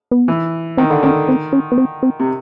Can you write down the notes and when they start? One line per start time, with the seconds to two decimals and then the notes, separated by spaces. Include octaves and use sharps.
0.11 B3
0.28 E3
0.77 D#3 C4
0.90 D3
1.03 D#3 C#4
1.29 C4
1.53 C#4
1.72 B3
1.78 C4
2.03 C4
2.20 C3